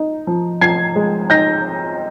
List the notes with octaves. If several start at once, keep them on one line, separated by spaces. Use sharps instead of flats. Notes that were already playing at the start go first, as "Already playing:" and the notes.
Already playing: D#4
F3
F3 G#6 C7
G#3
D#4 G6 A#6